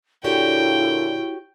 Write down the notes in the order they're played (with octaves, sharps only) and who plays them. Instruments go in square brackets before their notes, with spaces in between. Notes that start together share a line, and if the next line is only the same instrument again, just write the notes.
[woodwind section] A#2 D3 [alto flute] E4 [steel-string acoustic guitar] F#4 G4 C#5 [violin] G5